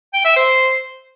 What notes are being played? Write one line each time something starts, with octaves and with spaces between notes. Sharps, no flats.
G5
E5
C5